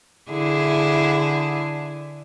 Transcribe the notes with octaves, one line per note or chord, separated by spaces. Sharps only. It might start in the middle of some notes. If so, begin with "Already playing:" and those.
D3 E4 G#4